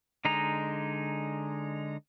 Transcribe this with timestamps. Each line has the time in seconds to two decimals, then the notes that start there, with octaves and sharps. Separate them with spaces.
0.25 D3 G#3 D#4 A#5